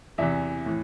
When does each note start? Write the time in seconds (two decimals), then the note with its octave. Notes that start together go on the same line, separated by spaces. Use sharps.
0.18 E2 C3 E3 E5
0.66 A2 E3